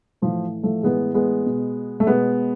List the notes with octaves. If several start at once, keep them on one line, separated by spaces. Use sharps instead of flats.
A2 E3 F3
F3 A3
A2 E3 G#3 B3
G#3 B3
B2
A3
B2 G#3 B3